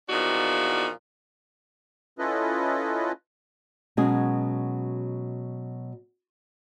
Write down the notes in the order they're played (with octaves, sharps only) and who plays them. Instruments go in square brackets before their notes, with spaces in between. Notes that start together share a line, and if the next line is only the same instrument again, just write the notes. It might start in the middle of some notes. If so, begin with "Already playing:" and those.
[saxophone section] E2 A#2 F3 D4 D#4 F#4
[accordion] C#4 E4 F4 A4 B4 D#5
[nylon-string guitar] B2 F#3 G#3 C#4 G#4